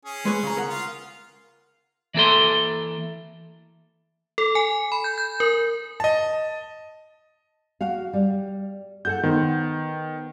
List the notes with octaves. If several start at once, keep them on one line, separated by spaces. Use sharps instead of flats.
C#4 G#4
G#3 B4 C#5
C#3 A#5
A#4 F#5
F4
E3 A#3 A4 C6
A4
G#5
B5
G6
G6
A#4
D#5 A5
F#4 F5
G3
F#4 A4 F#5 G6
D#3 B3 C5